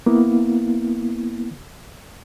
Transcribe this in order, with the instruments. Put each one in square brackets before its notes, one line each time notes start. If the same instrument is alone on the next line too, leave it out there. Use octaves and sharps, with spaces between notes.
[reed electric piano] A#3 B3 E4